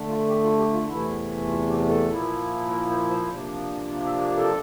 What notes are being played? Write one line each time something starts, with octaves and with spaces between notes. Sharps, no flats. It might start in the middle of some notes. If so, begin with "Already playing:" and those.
Already playing: D3 A3
F4
G4
F4
G4
F4
E2 C3 E3 A3 E4
F4
G4
A4
A#2 F3 A#3 E4
A#4
C5
C5
C3 F3 A#3 D4
E5
D5
A4